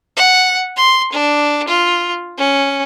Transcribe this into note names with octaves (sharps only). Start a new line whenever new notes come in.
F#5
C6
D4
F4
C#4